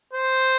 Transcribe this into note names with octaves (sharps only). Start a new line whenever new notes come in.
C5